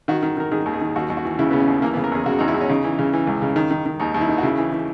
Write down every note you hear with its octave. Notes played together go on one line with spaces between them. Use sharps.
D#3 F#4
D#3
D#3 A#4
D#3 G#4
D#2
G#4
D#3
D#2 F#4
D#2
F#4
E3
C#3 E4
C#3 B3
C#4
D#2
E3 A#3
B3
C#3
A#4
E2 G#4
C#3 F#4
E2 D#4
E4
E2
C#4
C#3 D#4
E3
C#3
E3
C#2
C#3
D#3
D#3
D#3
D#2 D#4
D#2 D#4
E4
D#3
F#4
C#3 E4
E3
E3